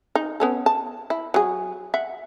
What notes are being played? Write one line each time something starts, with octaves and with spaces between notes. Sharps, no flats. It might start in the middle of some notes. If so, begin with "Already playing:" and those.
D#4
B3 C#4 A4
A5
E4
F#3 G#4
E5 F#5